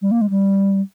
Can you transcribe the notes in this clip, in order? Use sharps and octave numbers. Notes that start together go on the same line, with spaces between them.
G3
A#3
G#3
G3